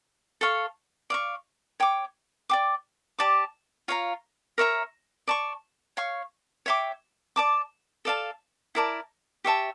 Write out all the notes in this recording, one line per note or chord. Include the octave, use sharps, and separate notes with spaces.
A4 C#5 F5 C#6
D5 F5 C#6
C#5 G5 D6
D5 G5 D6
G4 D5 A5 D6
F4 C#5 F5 A#5
A#4 C#5 E5 A#5
D5 A5 C#6
C#5 F5 C#6
C#5 E5 G5 D6
D5 A5 D6
A4 D5 F5 A5
E4 A#4 D5 A5
G4 C#5 E5 A5